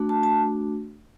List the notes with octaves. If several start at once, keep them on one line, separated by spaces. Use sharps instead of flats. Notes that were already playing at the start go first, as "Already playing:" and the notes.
Already playing: A3 D4 F#4
A5
A5